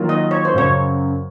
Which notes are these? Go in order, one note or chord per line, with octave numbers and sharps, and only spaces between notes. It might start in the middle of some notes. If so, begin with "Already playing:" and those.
Already playing: D#3 F#3 A#3 F4
D#5
C#5
C5
F#2 C#3 F#3 C#5